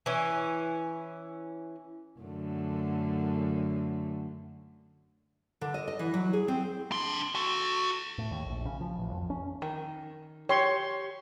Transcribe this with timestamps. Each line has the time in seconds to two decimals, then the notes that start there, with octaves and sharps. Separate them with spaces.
0.06 E3 C#4
2.20 F#2 D3 A3
5.61 D3
5.74 D#5
5.88 D#5
5.99 E3
6.14 F#3
6.33 G#4
6.48 C4
6.92 D4 C6
7.35 F#4 A4
8.18 A2
8.31 D#2
8.46 A#1
8.65 C#3
8.81 F3
8.98 A1
9.11 F2
9.30 C#4
9.62 D#3
10.49 G4 C#5 C6